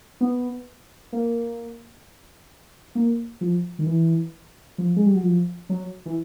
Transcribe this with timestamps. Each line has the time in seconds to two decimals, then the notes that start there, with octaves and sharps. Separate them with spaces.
0.21 B3
1.13 A#3
2.95 A#3
3.41 F3
3.79 D#3
3.87 E3
4.78 F3
4.96 G#3
5.06 G3
5.15 F#3
5.24 F3
5.69 F#3
6.06 E3